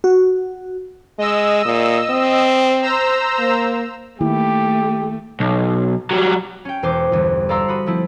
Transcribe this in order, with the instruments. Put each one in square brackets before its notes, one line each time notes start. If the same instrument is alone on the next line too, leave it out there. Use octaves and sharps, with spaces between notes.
[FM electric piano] F#4
[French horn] G#3 [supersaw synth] D#5 E6
[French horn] A#2
C4
[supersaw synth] C5 A#5 E6
[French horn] A#3
[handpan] D#3 A#3 E4 [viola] A3 [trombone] G4
[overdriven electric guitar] B1
F#3 G3
[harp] C#4 G5
E1 E2 C5 D6
G1 E2
A4 D5 F5 A#5 C6 E6
F#4 B5 D#6
F3 A3 C4 E4